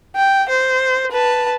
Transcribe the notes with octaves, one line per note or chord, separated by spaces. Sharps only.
G5
C5
B4 A5